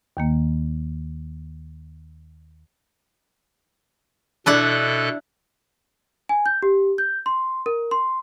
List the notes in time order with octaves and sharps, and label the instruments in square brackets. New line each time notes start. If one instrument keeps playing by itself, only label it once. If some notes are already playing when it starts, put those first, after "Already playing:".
[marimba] D#2 D#3 A#3
[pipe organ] B2 A4 F#6 [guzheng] D4 E4 D5
[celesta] G#5
G6
G4
G6
C6
A#4
C6